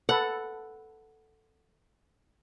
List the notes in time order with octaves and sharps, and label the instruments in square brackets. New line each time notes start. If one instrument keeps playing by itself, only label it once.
[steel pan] A4 B4 [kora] F#5